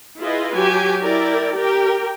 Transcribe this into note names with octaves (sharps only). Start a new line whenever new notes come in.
E4 F4 G#4 B4 D#5
F#3 G4 G#5
E4 A#4 D5 G5
G4 A#4 G5